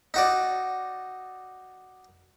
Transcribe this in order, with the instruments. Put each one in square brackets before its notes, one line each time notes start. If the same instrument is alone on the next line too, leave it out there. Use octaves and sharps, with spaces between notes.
[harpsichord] D#4 F#4 D5